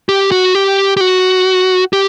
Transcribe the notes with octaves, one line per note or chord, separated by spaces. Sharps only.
G4
F#4
G4
G4
F#4
G4